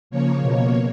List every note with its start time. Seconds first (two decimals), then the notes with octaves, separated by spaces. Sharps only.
0.10 C#3 F3 A#3 C#5
0.41 B2 A#3